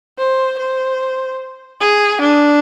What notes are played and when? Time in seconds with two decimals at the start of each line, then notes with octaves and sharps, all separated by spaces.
0.18 C5
0.59 C5
1.81 G#4
2.21 D4